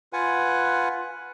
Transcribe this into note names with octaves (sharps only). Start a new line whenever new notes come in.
F4 B4 F#5 G#5